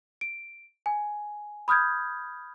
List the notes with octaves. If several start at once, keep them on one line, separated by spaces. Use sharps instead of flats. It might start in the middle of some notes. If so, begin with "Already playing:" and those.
D7
G#5
B5 D#6 F6 G6 G#6